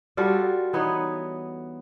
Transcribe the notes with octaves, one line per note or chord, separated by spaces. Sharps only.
G3 F4 F#4 A4
E3 B3 D#4 C#5